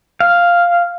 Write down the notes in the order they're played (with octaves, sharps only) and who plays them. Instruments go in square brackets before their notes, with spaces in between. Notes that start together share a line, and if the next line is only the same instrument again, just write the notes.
[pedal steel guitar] F5